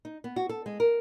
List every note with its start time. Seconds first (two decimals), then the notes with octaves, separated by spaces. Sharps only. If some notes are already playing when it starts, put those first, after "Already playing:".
0.05 D#4
0.24 B3
0.36 F#4
0.49 A4
0.66 G#3
0.80 A#4